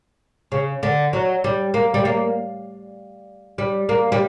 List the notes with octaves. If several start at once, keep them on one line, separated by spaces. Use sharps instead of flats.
C#3
D3
F#3
G3
A#3
G3
A#3
G3
A#3
G3